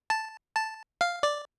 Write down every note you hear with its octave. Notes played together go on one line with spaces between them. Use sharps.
A5
A5
F5
D5